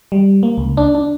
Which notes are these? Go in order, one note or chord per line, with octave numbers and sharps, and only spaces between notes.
G3
A#3
C#2
D4
D4